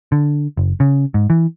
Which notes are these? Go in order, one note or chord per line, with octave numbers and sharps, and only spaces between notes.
D3
F#1
C#3
G#2
E3